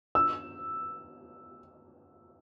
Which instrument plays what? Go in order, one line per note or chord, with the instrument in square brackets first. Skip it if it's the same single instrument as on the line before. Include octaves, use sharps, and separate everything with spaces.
[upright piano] E6